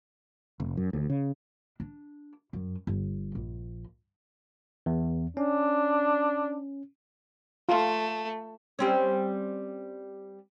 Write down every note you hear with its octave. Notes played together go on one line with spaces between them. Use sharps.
F1
F#2
D2
C#3
D4
F#2
G1
A#1
E2
C#4 D4
A3 F4
G3 C4 C#4